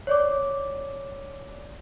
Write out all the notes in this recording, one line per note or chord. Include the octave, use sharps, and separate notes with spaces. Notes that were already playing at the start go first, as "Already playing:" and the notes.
C#5 D5 D6